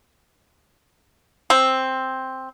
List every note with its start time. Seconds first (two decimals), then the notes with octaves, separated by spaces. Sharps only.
1.50 C4